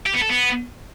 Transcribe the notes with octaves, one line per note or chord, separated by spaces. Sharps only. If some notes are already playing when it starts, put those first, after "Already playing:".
G4
B3
A4
B3